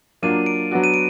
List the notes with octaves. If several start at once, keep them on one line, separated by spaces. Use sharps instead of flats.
F#3 A#3 D4 F4 D#7
D7
F#3 B3 D4 F#4
D#7
D7